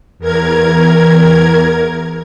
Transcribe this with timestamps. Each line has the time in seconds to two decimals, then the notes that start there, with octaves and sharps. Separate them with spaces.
0.19 E2 A#4 G#6